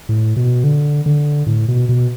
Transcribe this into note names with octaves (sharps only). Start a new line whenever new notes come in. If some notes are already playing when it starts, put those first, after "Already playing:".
A2
B2
D3
D3
A2
B2
B2